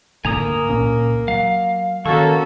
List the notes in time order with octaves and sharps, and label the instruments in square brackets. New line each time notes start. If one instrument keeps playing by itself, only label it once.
[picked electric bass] D2 G#2 D3 [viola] A#3 [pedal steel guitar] G#5 A#5 D#6
[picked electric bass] C#2 A#2 C#4
[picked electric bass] F#3 [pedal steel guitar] F5
[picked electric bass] D#3 [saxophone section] A#3 A4 [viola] C#4 F#4 [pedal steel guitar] C#6